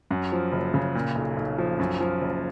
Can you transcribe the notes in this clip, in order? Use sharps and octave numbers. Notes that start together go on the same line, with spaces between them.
F#2
F3
F#1
C#3
A#2
B1
B1
F3
F#2
F3
F#1